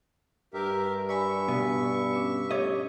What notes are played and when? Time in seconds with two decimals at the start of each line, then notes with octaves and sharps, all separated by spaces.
0.54 G2 G4 A#4 E5
1.09 D5 E5 G#5 B5 C#6
1.48 B2
2.14 C#4 D6
2.51 G4 C#5 D#5 D6